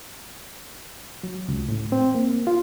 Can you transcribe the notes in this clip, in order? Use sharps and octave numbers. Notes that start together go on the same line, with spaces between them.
F#3
C#2
A2
C4
A#3
F4